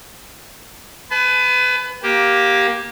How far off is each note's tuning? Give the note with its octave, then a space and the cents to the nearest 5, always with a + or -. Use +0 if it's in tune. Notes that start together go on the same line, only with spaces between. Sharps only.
B4 +25 A5 -40
A#3 +15 G4 +0